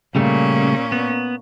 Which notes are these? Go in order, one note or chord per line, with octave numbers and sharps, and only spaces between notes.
A#2 C#3 G3 A3 C#4
B3